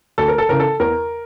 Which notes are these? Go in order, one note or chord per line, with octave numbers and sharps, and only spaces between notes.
D2 A4
A#4
A4
C#3 E3 A#4
A4
E2 A#4